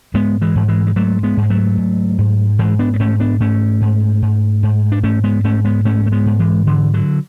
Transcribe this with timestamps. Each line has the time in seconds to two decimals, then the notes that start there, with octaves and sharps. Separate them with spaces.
0.14 G#2 G#3 B3
0.42 E3 G#3
0.55 G#2
0.68 E3 G#3
0.87 G#3
0.96 G#2 F#3 A3
1.23 G#3 B3
1.37 G#2
1.43 G#3
1.50 F#3 A3
1.78 G#2
2.18 G#2
2.59 G#2 E3 G#3
2.79 B3 D4
2.94 B3
3.00 G#2 A3 C#4
3.20 B3 D4
3.40 G#2 A3 C#4
3.81 G#2
4.22 G#2
4.63 G#2
4.92 D4
5.03 G#2 A3 C#4
5.24 G#3 B3
5.44 G#2 A3 C#4
5.65 G#3 B3
5.85 G#2 A3 C#4
6.06 A3
6.12 G#3 B3
6.26 G#2
6.39 E3 G#3
6.67 D3 E3
6.94 D3 F#3